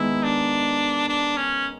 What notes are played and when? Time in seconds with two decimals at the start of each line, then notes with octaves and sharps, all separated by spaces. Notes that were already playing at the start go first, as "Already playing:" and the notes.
Already playing: D#3 G#3 B3 E4
0.23 D4
1.09 D4
1.37 C#4